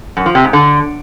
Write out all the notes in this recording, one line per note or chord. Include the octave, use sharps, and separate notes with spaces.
F#2
F3
C3
G#2
D3